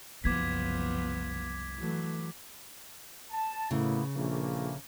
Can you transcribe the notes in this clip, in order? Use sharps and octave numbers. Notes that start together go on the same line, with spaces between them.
F#1 C2 F3 G3 B3 D6 G#6 B6
E3 F#3 A3
A5
A2 C#3 A#3 B3 E4
A#1 E3 A3 A#3